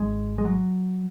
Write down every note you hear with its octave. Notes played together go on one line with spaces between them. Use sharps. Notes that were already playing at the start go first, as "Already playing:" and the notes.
Already playing: G#1 G#2 G#3
G#3
F#3